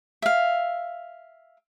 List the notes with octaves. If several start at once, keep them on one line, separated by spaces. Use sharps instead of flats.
E5 F5